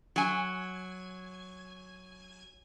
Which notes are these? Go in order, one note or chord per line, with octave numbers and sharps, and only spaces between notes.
F#3 G#5